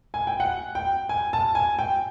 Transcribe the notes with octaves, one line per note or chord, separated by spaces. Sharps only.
G#5
G5
F#5
G5
G#5
A5
G#5
G5